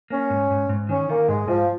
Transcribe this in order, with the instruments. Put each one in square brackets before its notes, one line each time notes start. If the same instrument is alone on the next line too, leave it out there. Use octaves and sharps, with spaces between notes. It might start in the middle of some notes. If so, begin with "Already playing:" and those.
[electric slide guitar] A#3 [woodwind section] C#4
[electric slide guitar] G#2
G#2
G#2
[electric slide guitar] D#3 [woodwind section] C#4
[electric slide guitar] D#3 [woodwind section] A#3
[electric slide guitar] G#2 [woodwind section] G#3
[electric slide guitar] G#2 [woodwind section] F3